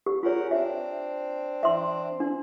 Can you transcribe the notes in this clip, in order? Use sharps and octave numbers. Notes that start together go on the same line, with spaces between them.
G4
F4 G#4 A#4 C#5 F#5
C4 D4 C5 E5
E5 C6
D4